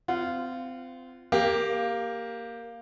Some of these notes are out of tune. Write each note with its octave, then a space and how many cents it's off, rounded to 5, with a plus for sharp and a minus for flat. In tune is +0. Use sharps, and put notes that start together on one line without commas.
C4 -30 F4 -15 F#5 +5
A#3 +0 G4 +10